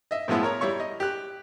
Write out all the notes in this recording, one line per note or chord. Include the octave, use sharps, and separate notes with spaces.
D#5 E5
A2 F3 G#3 B3 E4
A#4 C#5 A#5
G3 E4 C#5 C#6
D#5
G4 F#6